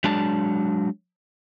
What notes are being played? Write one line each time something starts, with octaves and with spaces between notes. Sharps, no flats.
F#3 G#3 D4 A5